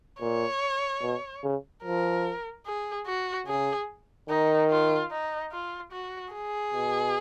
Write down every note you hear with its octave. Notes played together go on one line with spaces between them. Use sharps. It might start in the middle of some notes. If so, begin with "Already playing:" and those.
A#2 C#5
B2
C#3
F3 A#4
G#4
F#4
C#3 G#4
D#3 D#4
F4
D#4
F4
F#4
G#4
B2